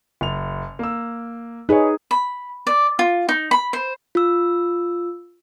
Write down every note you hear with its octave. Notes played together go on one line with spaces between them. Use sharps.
F#1 F7
A#3 E6
D#4 G#4 B4 C#5
B5
D5
F4
D#4
B5
C5
F4 E6